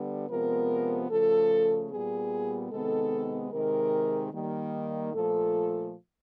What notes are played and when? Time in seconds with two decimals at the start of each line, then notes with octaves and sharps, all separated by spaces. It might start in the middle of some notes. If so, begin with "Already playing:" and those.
Already playing: D3 G3 B3
0.29 C3 F3 G#3 B3 A#4
1.09 C#3 F3 A3 A4
1.90 A#2 G3 B3 G#4
2.71 C3 D#3 G#3 B3 A4
3.52 C3 D#3 G#3 A#4
4.32 D#3 G3 A#3
5.14 A#2 F3 A3 A4